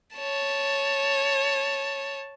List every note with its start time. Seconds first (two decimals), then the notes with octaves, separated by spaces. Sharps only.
0.16 C#5 A5